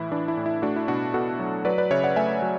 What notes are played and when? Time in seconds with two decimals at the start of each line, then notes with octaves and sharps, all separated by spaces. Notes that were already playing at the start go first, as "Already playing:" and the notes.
Already playing: A2 E3 E4
0.11 E3 D4
0.28 E4
0.37 A2
0.46 E4
0.62 A3 D4 F#4
0.76 E4
0.88 B2 D4 F#4
1.14 B2 F#4 A4
1.39 F#3
1.65 F#3 B4 D5
1.78 B4 D5
1.91 C#3 C#5 E5
2.04 D5 F#5
2.16 A3 E5 G#5
2.42 F#3